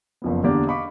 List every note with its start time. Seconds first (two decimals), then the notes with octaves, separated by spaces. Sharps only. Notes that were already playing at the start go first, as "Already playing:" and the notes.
0.22 F#1 F2 B3
0.43 E2 D3 A#3 D4 G4 D5
0.67 D#5 F5 B5 C#6 D6